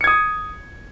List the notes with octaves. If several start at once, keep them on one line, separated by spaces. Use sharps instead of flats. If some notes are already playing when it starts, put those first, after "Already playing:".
D#6 G#6 C#7